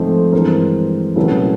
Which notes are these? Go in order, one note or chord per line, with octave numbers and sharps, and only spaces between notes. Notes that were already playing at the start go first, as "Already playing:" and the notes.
Already playing: G#2 F3 A3 C4 C5
G2 E3 G#3 C4 A#4 C5
C2 A#2 F#3 A3 C#4 A4 B4